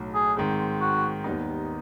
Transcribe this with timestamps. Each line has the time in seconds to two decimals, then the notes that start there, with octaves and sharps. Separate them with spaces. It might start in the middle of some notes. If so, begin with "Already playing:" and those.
Already playing: B1 A2 F#3
0.14 G#4
0.37 G#2 D#3 G#3 C4
0.80 F#4
1.24 D#2 D#3 G3 B3 D#4